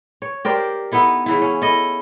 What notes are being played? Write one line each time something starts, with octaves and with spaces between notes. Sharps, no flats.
C#5
G4 A#4 C5 D5
B3 D#4 E4 A4
C#3 E3 E4
C#4
E4 A4 D#5